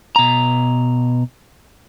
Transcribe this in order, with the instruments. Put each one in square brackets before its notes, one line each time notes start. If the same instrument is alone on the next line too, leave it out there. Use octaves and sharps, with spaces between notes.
[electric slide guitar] B2 A#5